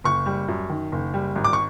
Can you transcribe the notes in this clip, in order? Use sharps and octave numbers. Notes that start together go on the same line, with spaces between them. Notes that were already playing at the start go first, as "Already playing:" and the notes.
F#1 C#6
G3
F#2
D#3
F#1
G3
G#1
D6
C#6